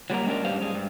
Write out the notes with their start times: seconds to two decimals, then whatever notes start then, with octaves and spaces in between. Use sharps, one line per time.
0.10 F#3 G3 A#3 A#5
0.27 G#3 C#4 D4 A#4
0.45 G#2 G3 G4 B4 C5 F5
0.61 G2 G#3
0.75 G2